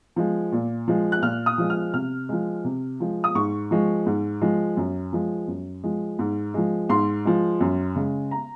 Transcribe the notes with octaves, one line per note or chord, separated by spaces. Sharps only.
F3 G#3
A#2
F3 G#3
F#6
A#2 F6
D#6
F3 G#3
F6
C3 F6
F3 G#3
C3
F3 G#3
D#6
G#2 C#6
F3 G#3
G#2
F3 G#3
F#2
F3 G#3
F#2
F3 G#3
G#2
F3 G#3
G#2 C6
F3 G#3
F#2
C#3 G#3
A#5